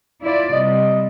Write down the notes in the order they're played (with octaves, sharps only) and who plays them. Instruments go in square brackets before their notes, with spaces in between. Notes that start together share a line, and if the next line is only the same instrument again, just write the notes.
[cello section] E4 F4 D5
[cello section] C3 G3 [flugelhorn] D#5